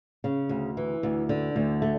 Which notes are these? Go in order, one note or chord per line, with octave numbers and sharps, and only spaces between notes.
C#3
D2
E3
D2
D3
D2
A3